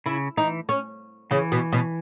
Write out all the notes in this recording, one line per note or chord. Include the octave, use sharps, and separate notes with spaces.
C#3 E4
E3 D#4
C#4
C#3 E3
B2
B2